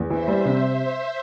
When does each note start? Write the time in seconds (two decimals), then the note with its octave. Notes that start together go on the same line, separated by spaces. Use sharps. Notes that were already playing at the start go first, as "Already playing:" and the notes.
Already playing: E2
0.09 E3 C5 E5
0.28 G3
0.45 C3